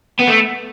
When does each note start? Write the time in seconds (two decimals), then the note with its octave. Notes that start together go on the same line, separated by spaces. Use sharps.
0.19 B3
0.27 A3